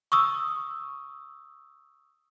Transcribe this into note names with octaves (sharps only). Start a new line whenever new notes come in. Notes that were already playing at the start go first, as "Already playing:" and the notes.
C#6 D#6 E6